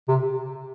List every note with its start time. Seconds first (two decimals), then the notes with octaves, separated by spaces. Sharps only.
0.08 C3